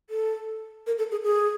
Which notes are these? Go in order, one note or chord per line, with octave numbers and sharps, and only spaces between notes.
A4
A#4
A4
G#4
G#4